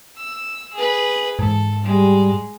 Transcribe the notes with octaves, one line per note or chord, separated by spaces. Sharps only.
E6
G#4 B4
G#2 E3 A4
G3 G#3